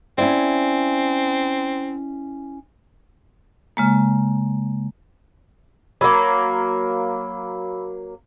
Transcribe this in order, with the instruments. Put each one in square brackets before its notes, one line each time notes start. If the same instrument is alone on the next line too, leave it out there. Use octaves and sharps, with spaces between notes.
[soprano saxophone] C4 [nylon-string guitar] C#4 E4 D5
[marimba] C#3 G#3 A#3
[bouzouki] F#3 A#3 [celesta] B5 E6